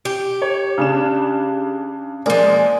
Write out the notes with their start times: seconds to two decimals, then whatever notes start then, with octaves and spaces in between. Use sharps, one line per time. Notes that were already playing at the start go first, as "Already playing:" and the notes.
0.05 G4
0.42 C#5
0.78 C#3 D4 E7
2.26 F3 G#3 A#3 D5